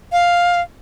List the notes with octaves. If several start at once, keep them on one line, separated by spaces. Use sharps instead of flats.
F5